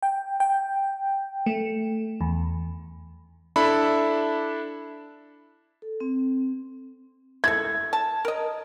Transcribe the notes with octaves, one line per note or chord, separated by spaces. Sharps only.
G5
G5
A3
E2
D4 E4 A4 E5 B5
A4
C4
E4 A4 G#6
A5
A#4 D#5